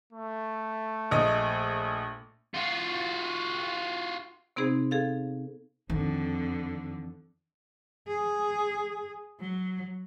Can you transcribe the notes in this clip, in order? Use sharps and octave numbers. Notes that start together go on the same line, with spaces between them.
A3
A#1 D#5
F4 F#4
C3 B3 C4 D#4 G#4 C5
G#4 A4 F5
F2 D3 D#3
G#4
F#3